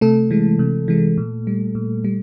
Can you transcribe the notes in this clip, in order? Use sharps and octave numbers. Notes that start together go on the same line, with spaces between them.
C3 A3 A4
E3 G#3
C3
E3 G#3
A#2
G3
A#2
G3